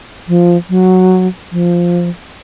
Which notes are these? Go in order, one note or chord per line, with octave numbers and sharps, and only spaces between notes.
F3
F#3
F3